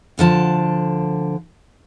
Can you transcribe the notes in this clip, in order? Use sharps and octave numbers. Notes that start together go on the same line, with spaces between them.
D2 D3 F3 A5